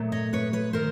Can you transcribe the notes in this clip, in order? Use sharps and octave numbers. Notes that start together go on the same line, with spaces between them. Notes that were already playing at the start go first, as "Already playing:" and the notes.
Already playing: A#2 F#3 A3
C#5 D#5
B4 C#5
B4 C#5
D#3 A#4 C5